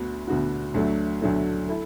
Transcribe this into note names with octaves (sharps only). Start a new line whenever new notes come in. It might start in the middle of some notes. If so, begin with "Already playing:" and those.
Already playing: D2 D3 B3 F#4
D2 D3 B3 F#4
D2 D3 F#3 A3
D2 D3 F#3 A3
E4 A4